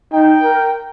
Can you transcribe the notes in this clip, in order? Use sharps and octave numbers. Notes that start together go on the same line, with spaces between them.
D#4 G5
A#4